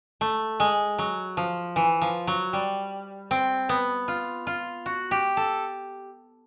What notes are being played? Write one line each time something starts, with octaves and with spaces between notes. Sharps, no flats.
A3
G#3
F#3
F3
E3
F3
F#3
G3
C4
B3
F4
F4
F#4
G4
A4